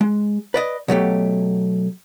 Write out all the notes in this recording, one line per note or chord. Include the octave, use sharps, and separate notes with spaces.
G#3
B4 D5 D#5
B2 F#3 A3 G4